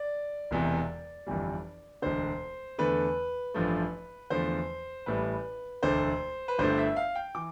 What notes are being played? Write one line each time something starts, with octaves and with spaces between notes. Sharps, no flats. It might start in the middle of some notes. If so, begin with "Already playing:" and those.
Already playing: D5
E1 E2 C3 E3
G1 F2 E3 G3
E1 D2 D3 C5
E2 D3 A3 B4
A1 G2 F3 A3
E2 D3 F3 A3 C5
A1 A2 G3 B4
E1 D2 D3 A3 C5
B4
G1 G2 D3 A3 C5
E5
F5
G5
E3 D6